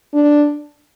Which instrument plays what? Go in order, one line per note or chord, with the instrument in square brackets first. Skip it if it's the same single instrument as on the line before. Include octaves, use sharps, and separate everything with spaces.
[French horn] D4